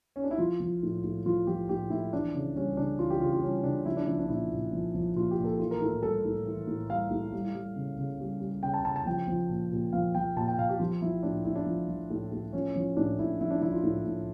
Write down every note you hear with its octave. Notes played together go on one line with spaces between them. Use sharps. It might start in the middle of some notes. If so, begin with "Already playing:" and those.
C#4
D4
E4
F3 F4
F3
A2
A2
F3 F4
F3 G4
A2 G4
A2 E4
E3 D4
C#3
G3 C#4
C#3 D4
E3 F4
G4
C#3 F4
F4
G3 C#4
C#3 D4
F3 E4
D4
F3 D4
D4
A#2 E4
A#2
F3
F3
A#2 F4
G4
A#2
A4
E3 F4
A#4
A2 A4
G3 A4
A2
E3
A2
G3 F5
A2
G3
G3
C#3
C#3
G3
G3
C#3 G5
A5
C#3 A5
A5
F3 G5
F3
A#2
A#2
F3 F5
F3 G5
A#2 A5
G5
A#2 F5
G4
F3 F4
F3 E4
A2 D4
A2 E4
D4
F3
F3
A2
A2
F3 C#4
F3 C#4
A2 D4
A2 E4
F3 E4
D4
F3 E4
F4
A2
A2